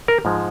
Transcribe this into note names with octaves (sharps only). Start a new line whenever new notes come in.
A#4
G#2 F3 G#3